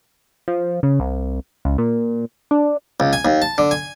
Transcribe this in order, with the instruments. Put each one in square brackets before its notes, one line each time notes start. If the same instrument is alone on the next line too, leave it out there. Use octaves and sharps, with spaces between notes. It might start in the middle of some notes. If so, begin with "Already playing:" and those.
[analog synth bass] F3
C#3
C2
C#2
A#2
D4
[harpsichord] C#2
G#5
D#2
A5
D3
G#5